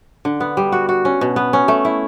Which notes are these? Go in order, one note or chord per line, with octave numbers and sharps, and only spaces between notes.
D3
B3
G3
F#4
F#4
C#4
B2
B3
C#4
A3
E4